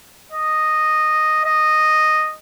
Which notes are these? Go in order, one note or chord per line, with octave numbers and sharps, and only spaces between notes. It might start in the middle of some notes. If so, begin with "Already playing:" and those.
D#5
D#5